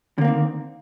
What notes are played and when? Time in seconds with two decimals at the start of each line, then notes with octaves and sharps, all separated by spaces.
0.18 D3
0.21 A#3
0.24 C4
0.28 D#3